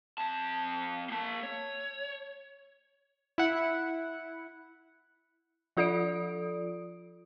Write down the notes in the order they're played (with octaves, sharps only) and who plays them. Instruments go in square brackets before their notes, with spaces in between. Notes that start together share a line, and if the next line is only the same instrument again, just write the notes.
[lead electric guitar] F2 A5
A#3 A5
C#5
[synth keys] E4 F#5
[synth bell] F3 F4 A4 D5 D#6 D7